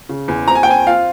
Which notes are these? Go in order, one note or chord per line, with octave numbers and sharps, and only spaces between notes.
C#3
E2
C4 A#5
G#5
G5
C4 G#5
F4 F5